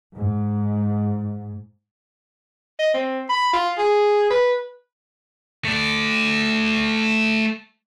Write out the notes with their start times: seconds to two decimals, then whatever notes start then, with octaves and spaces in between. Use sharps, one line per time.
0.15 G#2
2.79 D#5
2.94 C4
3.29 B5
3.53 F4
3.78 G#4
4.30 B4
5.65 A3 D5